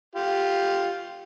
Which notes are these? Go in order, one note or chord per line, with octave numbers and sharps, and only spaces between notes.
F4 G4